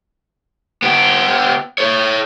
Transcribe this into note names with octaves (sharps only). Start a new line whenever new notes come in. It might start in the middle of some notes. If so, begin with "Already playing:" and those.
B3 G4
A4 C#5